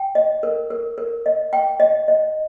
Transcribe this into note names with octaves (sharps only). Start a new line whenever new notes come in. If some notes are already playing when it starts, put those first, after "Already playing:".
Already playing: G5
D#5
A#4
A#4
A#4
D#5
G5
D#5
D#5